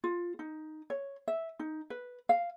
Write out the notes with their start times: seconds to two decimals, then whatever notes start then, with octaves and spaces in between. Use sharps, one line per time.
0.04 F4
0.39 D#4
0.90 C#5
1.28 E5
1.59 D#4
1.90 B4
2.29 F5